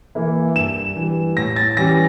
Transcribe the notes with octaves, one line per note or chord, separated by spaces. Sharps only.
E3 A#3 E4
G2 E7
E3 G3
A2 A#6
A6
E3 G3 C#4 A#6